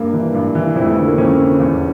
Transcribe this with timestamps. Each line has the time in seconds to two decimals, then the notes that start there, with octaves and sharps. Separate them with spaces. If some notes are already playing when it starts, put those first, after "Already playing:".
Already playing: G2 A#3
0.13 E3
0.34 G2
0.55 E3
0.76 F2 E4
0.86 A3
0.96 D3 A3
1.07 A#3
1.18 F2 C#4
1.39 D3
1.60 E2